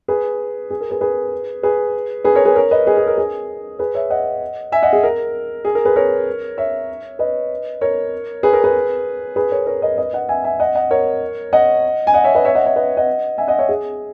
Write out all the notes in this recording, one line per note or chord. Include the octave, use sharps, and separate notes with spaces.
G#4 B4
G#4
A#4
G#4 B4
G#4 B4
G#4 B4
G#4 B4
A#4 C#5
G#4 B4
A#4 C#5
B4 D#5
G#4 B4
G#4
A#4
G#4
G#4 B4
C#5 E5
D#5 F#5
E5 G#5
D#5 F#5
G#4
A#4
G#4
A#4
G#4 B4
A#4 C#5
C#5 E5
B4 D#5
A#4 C#5
G#4 B4
A#4
G#4 B4
G#4 B4
A#4 C#5
A#4 C#5
B4 D#5
B4 D#5
D#5 F#5
E5 G#5
E5 G#5
D#5 F#5
D#5 F#5
A#4 C#5
D#5 F#5
G#5
D#5 F#5
C#5 E5
B4 D#5
C#5 E5
D#5 F#5
C#5 E5
B4 D#5
D#5 F#5
E5 G#5
D#5 F#5
C#5 E5
G#4